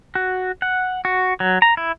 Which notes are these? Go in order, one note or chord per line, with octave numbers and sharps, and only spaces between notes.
F#4
F#5
F#4
F#3
A#5
E4